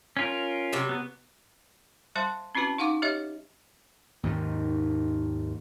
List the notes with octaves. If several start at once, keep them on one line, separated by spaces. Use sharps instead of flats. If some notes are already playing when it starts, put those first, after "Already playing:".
C#4 F4 A#4
C3 F#3 G3
B3
G3 C5 E5 A5 C6
C4 C#4 E4 F#4 B4 A5
D#4 F5 F#5 C#6 D6
G4 C#5 D#5 E5
D#2 G#2 D#3